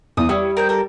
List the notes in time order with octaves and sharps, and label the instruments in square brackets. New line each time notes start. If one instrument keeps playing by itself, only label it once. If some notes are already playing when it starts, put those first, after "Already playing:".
[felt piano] E2 E3 [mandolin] D#6
[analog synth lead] G3 [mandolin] E4 C#5 [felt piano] D#6
[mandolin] A#4 C5 G5
A4 A#4